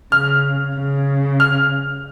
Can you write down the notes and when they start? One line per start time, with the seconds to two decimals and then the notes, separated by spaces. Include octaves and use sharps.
0.12 C#3 F6
0.76 C#3
1.40 F6